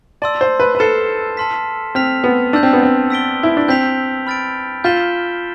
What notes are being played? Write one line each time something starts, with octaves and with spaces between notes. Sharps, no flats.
D5 A5 C6 E6
C5
B4
B4
A4 F6 C7 E7
A5 C6 F6 B6
C4 F6 B6 F7
B3
D4 A5 E6 G6
C4
B3
C4
E6 B6 D7 G7
E4
D4
C4 G6 B6 F7
B5 F6 A6 D7
F4 G6 B6 E7 G7